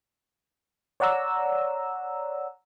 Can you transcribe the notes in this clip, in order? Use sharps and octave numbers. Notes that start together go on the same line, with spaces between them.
C#5 D5 F#5 A#5 E6